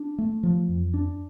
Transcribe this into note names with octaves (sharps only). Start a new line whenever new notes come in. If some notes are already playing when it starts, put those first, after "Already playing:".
Already playing: D4
A3
F3
F2
D4